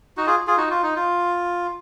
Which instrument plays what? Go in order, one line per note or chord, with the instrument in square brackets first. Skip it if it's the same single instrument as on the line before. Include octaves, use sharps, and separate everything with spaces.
[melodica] D#4 F#4
F4 G#4
F4 G#4
D#4 F#4
F4
D#4
F4